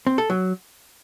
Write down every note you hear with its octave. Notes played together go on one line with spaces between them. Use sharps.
C4
A4
F#3